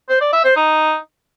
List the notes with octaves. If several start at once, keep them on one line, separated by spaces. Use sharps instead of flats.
C5
D5
E5
C5
D#4